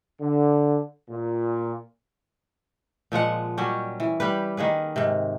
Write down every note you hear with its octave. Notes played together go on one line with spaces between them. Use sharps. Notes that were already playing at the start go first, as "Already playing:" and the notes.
D3
A#2
A#2 F3 G#3 F#5
F#3 G3 C#4 G4
E3
G3 G4 B4
D#3 A#3 G#4 B4
G#2 C3